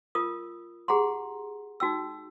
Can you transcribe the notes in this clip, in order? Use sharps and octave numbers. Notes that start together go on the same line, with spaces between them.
F4 A#4 D#6
G4 G#4 F#5 A#5 C6
D#4 F#4 G5 E6